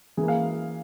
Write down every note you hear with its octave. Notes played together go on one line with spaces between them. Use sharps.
E3 A#3 G#4
F5